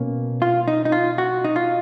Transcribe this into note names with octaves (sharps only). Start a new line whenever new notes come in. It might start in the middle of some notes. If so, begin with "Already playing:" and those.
Already playing: B2 A#3 C#4
F4
D#4
D#4
F4
F#4
D#4
F4